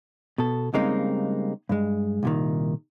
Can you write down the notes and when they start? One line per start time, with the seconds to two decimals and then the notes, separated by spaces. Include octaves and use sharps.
0.38 B2 A4
0.74 C#3 G3 G#3 A#3 C4 D#4
1.69 G2 G#3
2.23 C2 A#2 D#3